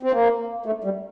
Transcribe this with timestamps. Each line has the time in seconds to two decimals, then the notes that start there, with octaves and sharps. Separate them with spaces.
0.03 C4
0.12 A#3
0.66 A3
0.84 G3